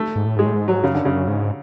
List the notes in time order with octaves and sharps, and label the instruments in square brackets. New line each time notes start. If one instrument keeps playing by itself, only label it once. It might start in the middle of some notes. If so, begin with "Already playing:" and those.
Already playing: [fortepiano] A3
[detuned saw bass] G#2
A2
[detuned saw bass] G#2 [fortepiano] G#3
[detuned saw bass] A2
G#2
[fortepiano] F#3
[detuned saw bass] F#2 [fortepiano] C#3
[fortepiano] D3
[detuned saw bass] F#2 [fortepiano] C#3
[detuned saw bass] G#2